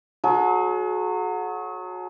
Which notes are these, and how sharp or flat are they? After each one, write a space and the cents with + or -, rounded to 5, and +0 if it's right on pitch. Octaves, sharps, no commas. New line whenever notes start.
F#3 -20 G#4 +40